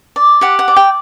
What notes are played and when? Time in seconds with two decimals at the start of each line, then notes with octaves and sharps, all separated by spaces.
0.16 D5
0.41 G4 F#5
0.59 F#5
0.68 D5
0.76 G5